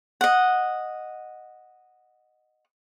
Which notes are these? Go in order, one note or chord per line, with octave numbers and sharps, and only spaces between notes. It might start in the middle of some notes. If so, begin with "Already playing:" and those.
D#5 F#5